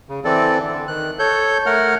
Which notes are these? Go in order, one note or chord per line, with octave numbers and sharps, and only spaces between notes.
C#3
E3 C4 A4 D5
D3
D#3 F#6
A4 C#5 G6
A3 A#4 F#5 F6